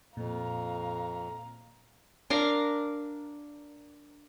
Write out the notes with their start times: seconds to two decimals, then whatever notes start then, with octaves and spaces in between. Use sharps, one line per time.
0.17 F2 A#2 F5 A#5
2.30 D4 A#4 F5 A#5